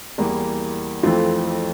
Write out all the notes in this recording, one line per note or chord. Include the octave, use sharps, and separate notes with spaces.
E2 E3 G3 A#3
F2 E3 A3 C4 F4